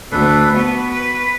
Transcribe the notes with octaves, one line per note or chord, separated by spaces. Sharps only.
D2 D4 A4 B4
B3 F#4
B4